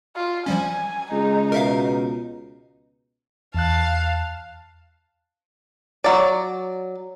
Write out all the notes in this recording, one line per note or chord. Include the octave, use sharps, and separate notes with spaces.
F4
F3 G3 C#4 G#5
C#2 G#3 D#4
B2 A#4 E5 F5
E2 F5 A5 F#6
F#3 D5